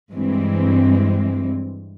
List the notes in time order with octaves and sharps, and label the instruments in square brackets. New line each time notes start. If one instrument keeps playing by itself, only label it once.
[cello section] G2 E3 G#3 C4